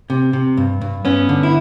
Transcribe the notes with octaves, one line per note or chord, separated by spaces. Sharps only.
C3
C3
G2
G2
G2 B3 C#4
D3
E4